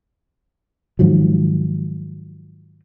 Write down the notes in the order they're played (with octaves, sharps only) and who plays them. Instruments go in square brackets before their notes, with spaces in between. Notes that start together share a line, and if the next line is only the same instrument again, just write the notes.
[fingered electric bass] G#2 D#3 F3 F#3